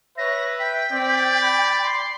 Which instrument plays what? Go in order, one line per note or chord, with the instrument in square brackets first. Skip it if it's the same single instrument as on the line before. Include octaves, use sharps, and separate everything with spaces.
[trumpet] B4 [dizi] C#5 [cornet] E5 [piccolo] A#6
[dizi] G5 [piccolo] B6
[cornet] C4 [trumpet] D5
[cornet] B5
[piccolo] C6